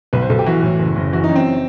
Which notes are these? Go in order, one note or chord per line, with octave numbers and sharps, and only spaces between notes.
B1 B4
C5
B1 A4
G4
E3 F#4
A2
F#1
F#1
E3 F#4
D#4
F#2
C4